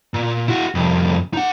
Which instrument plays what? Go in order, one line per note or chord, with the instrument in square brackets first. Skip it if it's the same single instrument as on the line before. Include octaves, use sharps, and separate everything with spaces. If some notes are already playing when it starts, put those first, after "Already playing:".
[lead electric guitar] A#2
E4 F#4
C2 F2
D#4 F#5